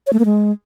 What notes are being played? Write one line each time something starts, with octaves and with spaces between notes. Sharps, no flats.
C#5
A3
A#3
G#3